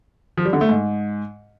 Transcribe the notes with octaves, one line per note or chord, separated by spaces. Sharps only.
F3
G3
D3
A3
G#2